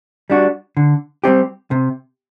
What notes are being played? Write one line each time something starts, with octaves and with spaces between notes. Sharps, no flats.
G3 D4 F#4
D3
G3 C4 G4
C3